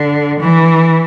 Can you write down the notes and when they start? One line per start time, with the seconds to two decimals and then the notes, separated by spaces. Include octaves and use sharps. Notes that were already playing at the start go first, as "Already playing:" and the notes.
Already playing: D3
0.39 E3